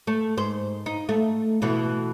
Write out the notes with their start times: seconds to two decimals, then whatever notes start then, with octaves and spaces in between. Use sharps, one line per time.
0.07 A3
0.37 G#2 C5
0.86 D#4
1.09 A3
1.62 B2 E3 A3